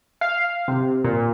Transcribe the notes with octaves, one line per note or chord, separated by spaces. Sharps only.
F5
C3
A#2